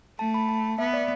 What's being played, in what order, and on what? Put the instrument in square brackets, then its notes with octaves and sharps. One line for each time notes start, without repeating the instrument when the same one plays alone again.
[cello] A3 [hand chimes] A5
[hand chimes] B5
A5
[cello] B3 [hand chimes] E5
[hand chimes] D5